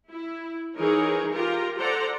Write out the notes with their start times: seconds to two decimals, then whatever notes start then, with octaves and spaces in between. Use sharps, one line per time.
0.10 E4
0.77 E3 D#4 G#4 A#4 C#5
1.33 F4 G4 A#4 A#5
1.78 A4 C5 D5 F#5 A#5